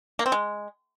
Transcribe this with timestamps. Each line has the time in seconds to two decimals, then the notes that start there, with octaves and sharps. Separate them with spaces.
0.19 A#3
0.26 C4
0.32 G#3